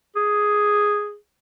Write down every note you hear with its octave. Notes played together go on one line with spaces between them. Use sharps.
G#4